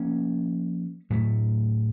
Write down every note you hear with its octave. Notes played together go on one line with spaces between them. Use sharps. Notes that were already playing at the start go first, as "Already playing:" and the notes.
Already playing: F3 A#3 C#4
A2 F#3 A3